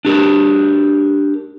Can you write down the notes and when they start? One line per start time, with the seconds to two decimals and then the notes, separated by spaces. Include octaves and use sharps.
0.05 D4 G4 A#4